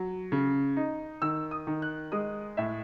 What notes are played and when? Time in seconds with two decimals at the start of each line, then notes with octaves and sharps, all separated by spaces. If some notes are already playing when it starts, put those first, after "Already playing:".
Already playing: F#3
0.32 C#3
0.76 D#4
1.22 D#3 E6
1.51 D#6
1.67 D#3
1.82 F#6
2.12 G#3 D#6
2.57 A2 E5